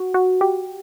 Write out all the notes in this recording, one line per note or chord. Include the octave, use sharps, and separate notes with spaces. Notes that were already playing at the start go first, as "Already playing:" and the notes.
Already playing: F#4
F#4
G4